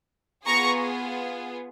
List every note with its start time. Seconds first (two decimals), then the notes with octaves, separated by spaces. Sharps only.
0.45 B3 F4 G#4 A#5 C#6